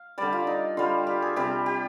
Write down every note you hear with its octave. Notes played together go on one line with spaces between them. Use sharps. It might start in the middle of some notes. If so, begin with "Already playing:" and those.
Already playing: F5
D3 G3 D5
F4
D#4
D3 G3 F4
G4
G#4
C3 G3 G4
G4